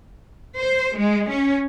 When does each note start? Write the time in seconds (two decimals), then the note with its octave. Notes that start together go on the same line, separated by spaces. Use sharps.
0.59 C5
0.97 G#3
1.30 C#4